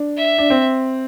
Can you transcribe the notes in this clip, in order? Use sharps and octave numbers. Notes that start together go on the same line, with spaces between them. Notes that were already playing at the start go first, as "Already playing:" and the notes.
Already playing: D4
E5
D4
C4